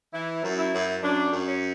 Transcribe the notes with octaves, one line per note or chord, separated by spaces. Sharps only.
E3 E4
F#2
E4
F#2
F#2 D4
F#2
C#4